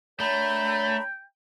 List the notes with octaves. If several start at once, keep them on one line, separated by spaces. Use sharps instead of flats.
A3 D4 A#4 C#5 G5 A#5 B5